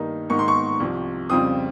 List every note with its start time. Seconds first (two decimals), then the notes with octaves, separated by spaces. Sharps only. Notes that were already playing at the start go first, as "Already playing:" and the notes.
Already playing: G2 D#3 A#3 D#4
0.29 G#2 D#3 A#3 D#4 C#6
0.39 C6
0.48 C#6
0.80 C2 C3 F3
1.30 F2 C#3 G3 C4 F4 D#6